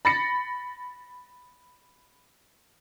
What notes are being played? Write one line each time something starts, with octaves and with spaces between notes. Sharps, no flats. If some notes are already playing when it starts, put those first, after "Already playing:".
B5 A6 A#6 C#7